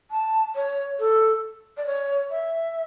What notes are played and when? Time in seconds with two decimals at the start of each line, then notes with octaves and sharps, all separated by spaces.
0.11 A5
0.55 C#5
0.99 A4
1.77 D5
1.86 C#5
2.30 E5